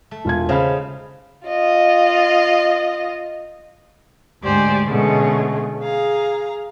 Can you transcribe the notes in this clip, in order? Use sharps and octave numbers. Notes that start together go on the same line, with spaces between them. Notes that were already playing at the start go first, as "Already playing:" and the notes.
A3
E1 F4 G#6
C#3 D#4 C5 F5 B5
F4 D#5
D2 G#2 G4 C5 D5 G#5
B2 D3 G#3 A3 C#4
G#4 F5 A#5